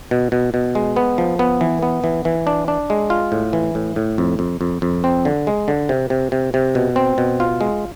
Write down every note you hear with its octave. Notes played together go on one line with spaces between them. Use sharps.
B2
B2
B2
G#3
B3
F3
B3
E3
B3
E3
E3
D4
D4
G#3
F4
A2
E3
A2
A2
F2
F2
F2
F2
C4
D3
G#3
D3
C3
C3
C3
C3
B2
C4
B2
F4
G#3